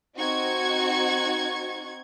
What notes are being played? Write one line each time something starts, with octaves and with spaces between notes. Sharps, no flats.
C4 D#4 F#4 C#6 G#6